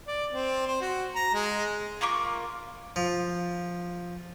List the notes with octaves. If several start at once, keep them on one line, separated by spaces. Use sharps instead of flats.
D5
C4
C5
F#4
A#5
G#3
A#3 F4 C#6 D6
F3